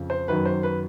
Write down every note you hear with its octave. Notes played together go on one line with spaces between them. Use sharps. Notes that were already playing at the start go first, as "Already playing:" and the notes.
Already playing: F2 C#3 F3
C5
F#2 D#3 F#3 B4
C5
B4